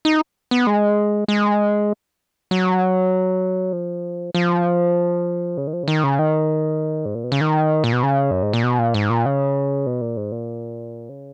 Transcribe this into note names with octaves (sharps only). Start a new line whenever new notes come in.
D#4
B3
G#3
G#3
F#3
F3
F3
C#3
D#3
F3
C#3
D#3
C#3
D#3
G#2
A#2
B2
C#3
D#3
A#2
B2
C#3
F#2
G#2
A#2
B2
A#2
G#2
A#2
C#3
B2
A#2
G#2
A#2
C#3